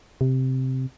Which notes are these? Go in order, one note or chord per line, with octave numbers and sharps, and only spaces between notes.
C3